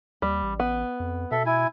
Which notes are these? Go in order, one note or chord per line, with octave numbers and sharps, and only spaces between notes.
D#2 G3
A1
B3
F2
B2 A4 E5
E4 G#5